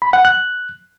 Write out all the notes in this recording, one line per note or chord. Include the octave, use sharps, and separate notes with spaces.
B5
F#5
F#6